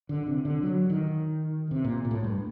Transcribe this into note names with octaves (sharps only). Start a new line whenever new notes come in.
D3
C3
D3
F#3
D#3
C3
A#2
A#2
A2
G2